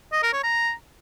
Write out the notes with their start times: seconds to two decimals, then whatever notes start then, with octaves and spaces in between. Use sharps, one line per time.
0.13 D#5
0.23 A#4
0.33 C#5
0.44 A#5